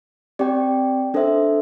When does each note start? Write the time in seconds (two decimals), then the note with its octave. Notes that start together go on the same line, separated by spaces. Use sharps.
0.39 C4 G4 D5 G5
1.14 D4 A4 C5 E5